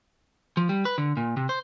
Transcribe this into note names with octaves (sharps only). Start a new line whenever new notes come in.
F3
G3
B4
D3
A#2
C3
C5